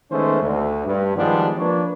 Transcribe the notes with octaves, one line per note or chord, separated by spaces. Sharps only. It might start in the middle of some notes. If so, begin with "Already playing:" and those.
D#3 G#3 A3 B3 C#4 C5
D2
G2
D#3 F3 G3 G#3 B3 D4
F3 A#3 D4 B4 C#5